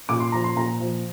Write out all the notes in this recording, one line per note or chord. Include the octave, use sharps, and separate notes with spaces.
A#2 D6
C6
F3 A#5
C6
A#2 A#5
F3